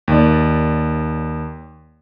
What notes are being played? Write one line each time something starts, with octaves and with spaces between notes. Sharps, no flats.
D#2 D5